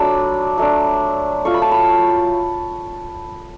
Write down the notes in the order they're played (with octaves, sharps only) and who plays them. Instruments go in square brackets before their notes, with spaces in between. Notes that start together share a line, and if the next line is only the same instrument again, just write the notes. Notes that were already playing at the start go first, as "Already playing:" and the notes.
Already playing: [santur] F#3 A3 D4 A5 B5
F#3 A3 D4
F#3 A3 F4 C#6
B5
A5
B5